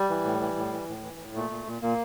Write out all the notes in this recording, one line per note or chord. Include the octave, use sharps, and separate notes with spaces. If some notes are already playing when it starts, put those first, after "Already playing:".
Already playing: G3
E3
A2
E3
A2
E3
A2
E3
A2
A#2 A3
A#2
A#2
A#2 A#3